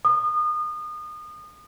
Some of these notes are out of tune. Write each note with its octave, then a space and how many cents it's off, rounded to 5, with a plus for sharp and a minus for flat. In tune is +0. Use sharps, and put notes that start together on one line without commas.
D#6 -30